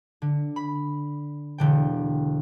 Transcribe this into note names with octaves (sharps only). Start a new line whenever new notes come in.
D3
B5
E1 D3 G5